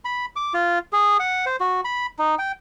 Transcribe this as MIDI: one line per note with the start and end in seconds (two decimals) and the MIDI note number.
0.05 0.26 83
0.36 0.53 86
0.54 0.79 65
0.93 1.17 68
1.19 1.45 78
1.46 1.56 72
1.60 1.81 66
1.85 2.06 83
2.19 2.35 63
2.39 2.52 79